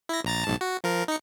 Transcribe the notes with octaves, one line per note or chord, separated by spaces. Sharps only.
E4 A#6
A#1 A#5 A6
B1 G#2 A5
F#4
F3 A#4
D#4 C#7